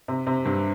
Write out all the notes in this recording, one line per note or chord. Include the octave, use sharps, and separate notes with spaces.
C3
C3
G2